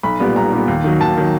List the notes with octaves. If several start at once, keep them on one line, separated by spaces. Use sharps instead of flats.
B1 B5
A#2 G3 B3
B1 A#5
A#2 G3 B3
D#2
D#3 F#3
D#2 A5
D#3 F#3